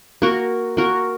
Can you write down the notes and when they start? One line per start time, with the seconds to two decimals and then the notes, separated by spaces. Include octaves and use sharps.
0.22 A#3 F#4 A#4
0.77 A#3 F#4 A#4